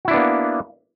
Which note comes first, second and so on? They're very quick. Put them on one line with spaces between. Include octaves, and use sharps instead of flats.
F#4 E4 D4 B3 A#3